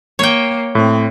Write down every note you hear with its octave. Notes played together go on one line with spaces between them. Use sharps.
A#3 C#5 G5
A2 C4